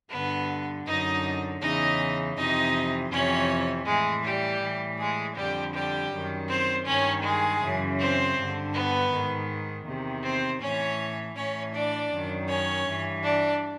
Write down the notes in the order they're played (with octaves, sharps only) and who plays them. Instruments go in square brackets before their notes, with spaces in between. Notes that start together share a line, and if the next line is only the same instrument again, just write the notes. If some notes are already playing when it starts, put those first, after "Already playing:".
[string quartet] G2 D3 B3 B4
F#2 D3 D#4 D#5
E2 C#3 E3 D#4 D#5
F2 C3 E3 D#4 D#5
F2 C3 E3 C#4 C#5
A2 E3 G#3 G#4
G3 G4
A2 E3
G#3 G#4
F2 D3 G3 G4
G3 G4
F#2 D#3
C4 C5
G2 D#3 C#4 C#5
G#3 G#4
F#2 C#3 E3
C4 C5
G2
D3
B3 B4
G#2 D#3
E2 C3 D#3
C4 C5
A2 E3 C#4 C#5
A2 E3 C#4 C#5
D4 D5
F#2 D#3
C#4 C#5
G2 E3
D4 D5